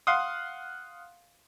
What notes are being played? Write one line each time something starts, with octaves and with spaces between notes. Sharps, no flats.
F5 F#5 C6 D#6